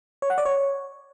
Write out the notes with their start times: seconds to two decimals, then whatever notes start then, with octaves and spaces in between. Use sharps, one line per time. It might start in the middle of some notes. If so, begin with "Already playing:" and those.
0.22 C#5
0.30 F#5
0.38 D5
0.45 C#5